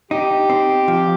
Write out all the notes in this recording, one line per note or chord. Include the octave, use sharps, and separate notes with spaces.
D#4 G4
C4
F3